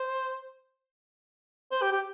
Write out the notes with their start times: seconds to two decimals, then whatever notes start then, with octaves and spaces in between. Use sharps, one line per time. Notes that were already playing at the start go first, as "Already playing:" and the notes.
Already playing: C5
1.72 C5
1.82 G4
1.93 G4